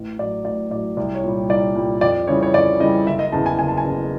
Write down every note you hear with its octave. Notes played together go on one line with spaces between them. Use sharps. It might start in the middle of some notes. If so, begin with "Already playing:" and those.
Already playing: A1
A2 F#3 D5
A1 D5
A2 D5
F#3
C2 D5
C#5
A#2 G3
C2 D5
A#2 G3
F2 D5
C#3 E3 G3 C#5
C#5
F2 D5
C#3 E3 G3 D#5
F#1 E5
D#5
E2 C#3 A5
G#5
F#1 G#5
A5
G#5
E2 C#3